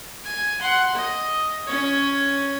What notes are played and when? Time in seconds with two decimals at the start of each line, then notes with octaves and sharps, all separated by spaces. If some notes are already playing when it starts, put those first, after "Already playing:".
0.25 G#5
0.61 F#5 C6
0.95 D#5
1.67 C#4 C#5